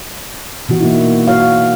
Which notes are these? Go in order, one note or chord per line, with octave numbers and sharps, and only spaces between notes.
B2 E3 F#4
A#3 D#4 E4
F#4 C#5 F5